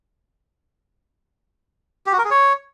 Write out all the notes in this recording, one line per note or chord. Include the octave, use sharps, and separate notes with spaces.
G4
F#4
A#4
G#4
C#5